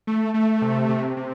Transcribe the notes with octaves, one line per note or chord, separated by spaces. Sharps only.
A3
A3
C3
C3
C3